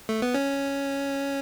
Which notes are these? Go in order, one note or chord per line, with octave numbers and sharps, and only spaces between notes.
A3
B3
C#4